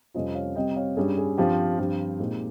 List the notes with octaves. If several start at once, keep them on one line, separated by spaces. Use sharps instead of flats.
F2 C3 G3 C#4 F4 C5 D#5
C#5 F5
C3 G3 C4 D#5 G5
C#5 F5
G2 G3 C#4 G#4
G#4
G2 F3 C4 F4 G4
G2 F3 C4 G4
A#2 G#3 C4 D#4